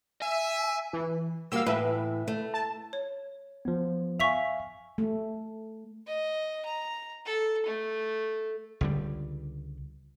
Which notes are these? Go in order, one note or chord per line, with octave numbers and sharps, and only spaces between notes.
E5 G#5
E3
G3 A#3 F#4 F5 E6
A2 E3 B4 E5
A3
A5
C#5
F3 B3
E5 F5 G#5 C#6 B6 F7
A3
D#5
A#5
A4
A3
C#2 D3 G3